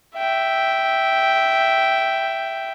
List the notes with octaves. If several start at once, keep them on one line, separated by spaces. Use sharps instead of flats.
E5 G5